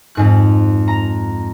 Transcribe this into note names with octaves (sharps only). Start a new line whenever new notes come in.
F2 G#2 F#6
A#5